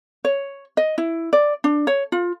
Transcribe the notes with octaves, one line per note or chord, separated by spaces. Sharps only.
C#5
D#5
E4
D5
D4
C#5
F4